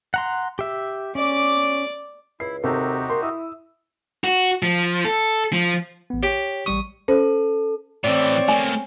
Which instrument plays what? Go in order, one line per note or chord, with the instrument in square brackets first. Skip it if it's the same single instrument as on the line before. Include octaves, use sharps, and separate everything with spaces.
[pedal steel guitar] F#5 A#5 C6
G4 E5
[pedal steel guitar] C#4 [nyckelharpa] D5 D6
[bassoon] C#2 [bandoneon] E4 [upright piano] C7
[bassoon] D#2 [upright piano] C3 C4 A4 [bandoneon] D#4 F#4 G4
[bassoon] A#3 [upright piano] C6
[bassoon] E4 [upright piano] D#6 E6
[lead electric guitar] F#4
F3
A4
F3
[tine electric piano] A1 B3
[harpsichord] G4 [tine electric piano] C#5 G5
[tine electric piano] A1 G3 C#6 [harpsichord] D#6
[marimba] C#4 C5 [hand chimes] A4
[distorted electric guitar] A2 E3 [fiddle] C4 C#5 [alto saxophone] D5
[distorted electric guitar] A3 A#3 [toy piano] G#5